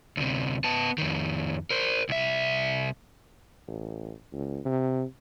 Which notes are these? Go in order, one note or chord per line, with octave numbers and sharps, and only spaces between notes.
D2 C3
B3 A5
F2 D#3
A#4 C5
C2 E5
A1
C#2
C3